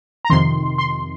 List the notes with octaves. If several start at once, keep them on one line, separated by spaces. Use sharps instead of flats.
A#5
F2 C3 D#3 C6
C6